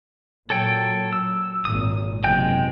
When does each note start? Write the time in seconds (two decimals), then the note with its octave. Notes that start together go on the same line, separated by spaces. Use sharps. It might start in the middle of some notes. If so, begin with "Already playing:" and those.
0.50 A#2 F#3 A4 C#5 G5
1.13 E6
1.65 G#1 A#2 D#6
2.24 F#1 C3 G#3 G5 G6